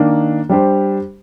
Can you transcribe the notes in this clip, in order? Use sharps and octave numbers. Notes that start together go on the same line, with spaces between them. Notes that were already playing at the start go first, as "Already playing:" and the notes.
Already playing: D#3 A#3 D4
G3 D4 G4 C5